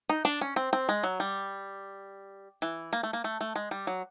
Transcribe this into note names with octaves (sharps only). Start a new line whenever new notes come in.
D#4
D4
C#4
C4
C4
G#3
F#3
G3
E3
A#3
A3
A#3
A3
A3
G#3
G3
F#3